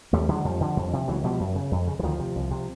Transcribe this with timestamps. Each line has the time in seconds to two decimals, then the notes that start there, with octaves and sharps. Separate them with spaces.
0.13 D#2 G3 A3
0.29 D3 F#3 G#3
0.45 F2 F3 G3
0.61 D3
0.77 F2
0.93 C3
1.08 C#2 E3 F#3
1.24 B2 F3 G3
1.40 F#2
1.56 C#3
1.71 F2
1.87 C#3
1.99 E3
2.03 D2 D#3 F3
2.19 C3
2.35 C2
2.51 C3